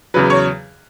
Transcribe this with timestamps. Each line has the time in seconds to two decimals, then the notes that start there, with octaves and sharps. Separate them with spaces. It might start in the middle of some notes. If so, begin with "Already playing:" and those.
0.14 E2 C#3 F#3 B4
0.30 C#5